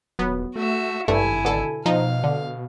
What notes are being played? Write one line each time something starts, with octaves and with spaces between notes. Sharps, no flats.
D#1 F#3 B3
A3 F#4 E5
G#1 G2 C3 A3 E4 G#5
B2 D3 A4
B2 F3 D#4 F5
D3